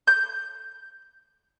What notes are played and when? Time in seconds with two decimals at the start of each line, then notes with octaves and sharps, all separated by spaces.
0.07 G6